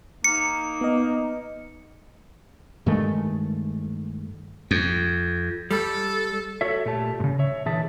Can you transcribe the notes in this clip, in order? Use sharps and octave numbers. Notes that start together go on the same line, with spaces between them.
A#3 D#4 C#7
B3 D#5
G2 D#3 G#3 A3
F2
G3 A4
F#4 A4 C#5 E5
A#2 A3 G4 A5
G#2 C#3
C#5 E5
A#2 D3 E3 G#4 E5 A5